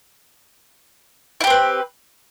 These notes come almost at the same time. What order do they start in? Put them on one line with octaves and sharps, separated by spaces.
E4 G4 C4 B4